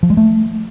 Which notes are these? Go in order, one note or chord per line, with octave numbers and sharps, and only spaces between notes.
F3
G#3
A3